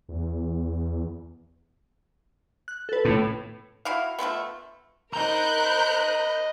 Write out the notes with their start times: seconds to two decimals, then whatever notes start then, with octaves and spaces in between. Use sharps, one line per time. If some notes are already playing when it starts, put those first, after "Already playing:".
0.09 E2
2.68 F#6
2.89 A4 B4
3.05 A2
3.85 E4 F#4 F5
4.19 F3 F#3 A3 B3
5.13 A#4 C5 D#5 A#5 B5 F#6 G6